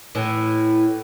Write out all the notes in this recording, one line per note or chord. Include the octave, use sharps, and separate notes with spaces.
A2 E3